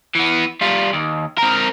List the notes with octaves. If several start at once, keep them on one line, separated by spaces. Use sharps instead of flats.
E3 B3
G3 F4
D#2
C4 A#4